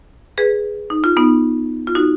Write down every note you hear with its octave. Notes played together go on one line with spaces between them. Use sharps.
G#4 B4
D#4
F4
B3 D#4
F4
D#4 F#4